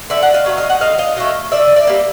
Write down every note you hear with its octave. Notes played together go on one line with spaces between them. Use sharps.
D3 D5 E5
F#5
D#5 F5
F#3 A3
D#5 F5
F#5
D3 D#5 F5
D#5 F5
F#3 A3 D#5 F5
D#3 D5 E5
D5 E5
G3 A#3